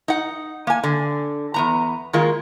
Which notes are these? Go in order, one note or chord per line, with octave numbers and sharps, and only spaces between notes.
D#4 F#5
A#3 G#5
D3
E2 B3 A#5
D#3 G#3 A#3 F4